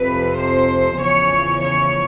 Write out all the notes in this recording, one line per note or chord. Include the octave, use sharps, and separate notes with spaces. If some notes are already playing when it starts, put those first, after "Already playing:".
Already playing: F2 C3 F3 B4
C5
E2 C#3 F3 C#5
C#5